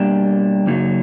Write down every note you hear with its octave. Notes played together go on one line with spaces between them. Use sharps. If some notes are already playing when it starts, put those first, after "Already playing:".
Already playing: B2 G3 A#3 D4 G4
F#2 C#3 F#3 A#3 D#4